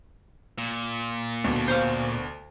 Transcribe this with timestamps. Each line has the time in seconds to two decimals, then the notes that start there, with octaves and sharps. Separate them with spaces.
0.58 A#2
1.44 D2 B2
1.68 C5 F5